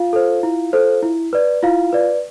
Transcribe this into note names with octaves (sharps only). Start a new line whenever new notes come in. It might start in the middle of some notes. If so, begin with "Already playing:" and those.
Already playing: F4 F5
A4 C5
E4
A4 C5
E4
B4 D5
E4 F4 F5
B4 D5